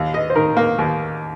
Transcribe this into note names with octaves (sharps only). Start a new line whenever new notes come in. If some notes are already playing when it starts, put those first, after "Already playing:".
Already playing: D#2
D#5
C5
D#3 A#4
A#3
D#2